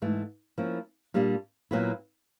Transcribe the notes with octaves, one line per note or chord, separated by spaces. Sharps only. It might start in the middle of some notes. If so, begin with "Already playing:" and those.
G#2 E3 A3
F3 A#3 C#4 E4
A#2 G3 A#3 D4
A#2 F#3 B3 E4